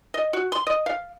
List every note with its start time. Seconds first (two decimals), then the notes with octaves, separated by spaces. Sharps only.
0.14 D#5
0.33 F#4
0.52 C6
0.67 D#5
0.86 F5